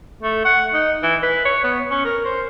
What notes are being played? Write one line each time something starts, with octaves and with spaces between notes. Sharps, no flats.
A3
F#5
D#4
E3
B4
C#5
B3
C#4
A#4
C5